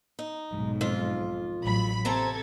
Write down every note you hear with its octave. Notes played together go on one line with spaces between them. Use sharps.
D#4
B1 G#2 F#3
F2 F4
A1 F#3 B5
C3 C4 A4 C5 A#5 G#6